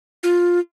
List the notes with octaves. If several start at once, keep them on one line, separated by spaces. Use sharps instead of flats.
F4